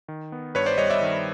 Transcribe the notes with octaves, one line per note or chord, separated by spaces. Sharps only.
D#3
B3
G2 B4 C#5
C5 D5
G3 C#5 D#5
D5 E5
D#3